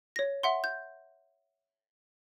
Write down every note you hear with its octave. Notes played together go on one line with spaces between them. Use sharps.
C#5 A#6
E5 F#5 C6
G6